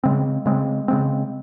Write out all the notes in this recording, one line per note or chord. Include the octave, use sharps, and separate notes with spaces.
C#3 G#3 C4
C#3 G#3 C4
C#3 G#3 C4